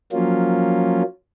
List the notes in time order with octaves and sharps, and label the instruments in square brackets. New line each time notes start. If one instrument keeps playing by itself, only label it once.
[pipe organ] F3 F#3 A#3 C#4 F4